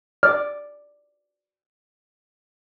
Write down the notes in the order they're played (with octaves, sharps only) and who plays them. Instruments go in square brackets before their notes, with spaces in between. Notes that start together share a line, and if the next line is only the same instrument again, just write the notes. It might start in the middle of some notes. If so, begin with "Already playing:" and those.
[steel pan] D5 [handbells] F6